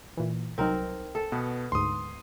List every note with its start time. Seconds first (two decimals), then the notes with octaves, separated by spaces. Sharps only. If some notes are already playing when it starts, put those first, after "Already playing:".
0.17 A#2 E3
0.58 C2 F#3 C4 D#4 A#4
1.15 A4
1.32 B2 B3
1.72 D2 G#2 C6 D#6